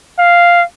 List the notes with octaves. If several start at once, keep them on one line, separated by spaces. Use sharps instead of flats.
F5